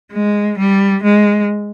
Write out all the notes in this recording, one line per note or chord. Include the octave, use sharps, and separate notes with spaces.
G#3
G3
G#3